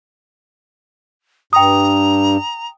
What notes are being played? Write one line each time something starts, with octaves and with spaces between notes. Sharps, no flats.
G2 G5 A#5 D#6